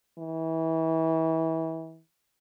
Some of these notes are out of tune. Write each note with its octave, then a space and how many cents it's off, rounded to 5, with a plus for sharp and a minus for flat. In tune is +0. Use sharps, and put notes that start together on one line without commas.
E3 -30